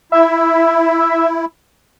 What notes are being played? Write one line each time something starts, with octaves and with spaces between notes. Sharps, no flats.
E4 E5